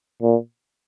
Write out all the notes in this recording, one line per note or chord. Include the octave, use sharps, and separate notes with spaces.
A#2